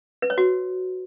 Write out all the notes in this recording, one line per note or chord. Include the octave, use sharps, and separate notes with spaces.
B4
C#5
F#4